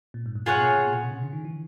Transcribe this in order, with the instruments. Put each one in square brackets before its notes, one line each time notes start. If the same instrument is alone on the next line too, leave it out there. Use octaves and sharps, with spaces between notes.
[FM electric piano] A#2
G#2
G2
[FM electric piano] C3 [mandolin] F4 G#4 C#5 F#5
[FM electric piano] B2
A#2
B2
A#2
B2
C3
C#3
D3
D#3
E3